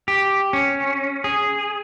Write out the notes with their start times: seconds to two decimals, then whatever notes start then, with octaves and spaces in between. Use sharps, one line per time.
0.08 G4
0.53 C#4
1.24 G#4